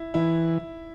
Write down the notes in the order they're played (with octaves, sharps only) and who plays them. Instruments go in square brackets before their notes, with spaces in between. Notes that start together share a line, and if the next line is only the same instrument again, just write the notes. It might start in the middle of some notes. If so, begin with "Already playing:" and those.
Already playing: [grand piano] E4
[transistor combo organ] E3 [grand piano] E4